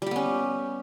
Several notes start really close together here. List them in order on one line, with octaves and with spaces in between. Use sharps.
G3 G4 B3 C#4